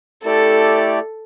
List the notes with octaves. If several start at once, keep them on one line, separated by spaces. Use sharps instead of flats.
A3 E4 G4 A4 D5